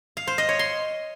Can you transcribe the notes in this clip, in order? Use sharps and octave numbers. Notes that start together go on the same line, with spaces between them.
F5
C5
D#5
C#5
C6